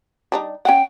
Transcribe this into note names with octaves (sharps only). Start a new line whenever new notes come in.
G3 D4 D#4
C#4 F#5 G5